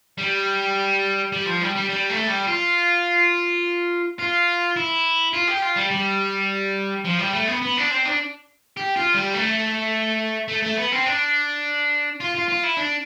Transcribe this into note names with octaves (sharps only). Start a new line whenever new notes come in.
G3
G3
F3
G3
G3
G3
A3
G3
F4
F4
E4
F4
G4
F4
G3
G3
F3
G3
A3
B3
B3
D4
C4
D4
G4
F4
G3
A3
A3
A3
B3
C4
D4
F4
F4
F4
E4
D4